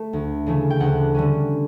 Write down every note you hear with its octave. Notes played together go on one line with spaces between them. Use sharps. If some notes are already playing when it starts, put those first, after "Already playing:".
Already playing: A3
D2
C#3 E3 A3
G5
D2 F#5
D3 G3 C#4